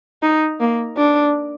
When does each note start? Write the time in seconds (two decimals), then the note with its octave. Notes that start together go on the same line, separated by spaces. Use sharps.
0.22 D#4
0.60 A#3
0.97 D4